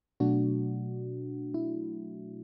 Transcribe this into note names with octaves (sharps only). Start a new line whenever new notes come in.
B2 F#3 A3 D4 F#4
E4